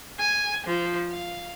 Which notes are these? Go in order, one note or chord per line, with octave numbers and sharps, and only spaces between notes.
G#5
F3
F5